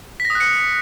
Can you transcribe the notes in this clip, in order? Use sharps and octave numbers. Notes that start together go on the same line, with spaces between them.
B6
A#6
D#6
F#6
C#7